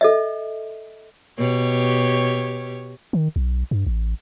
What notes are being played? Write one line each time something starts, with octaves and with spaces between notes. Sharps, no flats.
A4 D#5 E5
B2 G4 C#5
D#3
B1
G2
A1